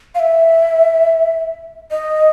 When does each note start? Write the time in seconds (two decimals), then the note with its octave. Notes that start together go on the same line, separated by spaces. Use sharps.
0.15 F5
0.19 E5
1.91 D#5